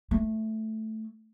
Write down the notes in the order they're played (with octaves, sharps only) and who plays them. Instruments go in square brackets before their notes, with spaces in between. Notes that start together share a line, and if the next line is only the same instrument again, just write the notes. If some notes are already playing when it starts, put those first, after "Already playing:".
[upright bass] A3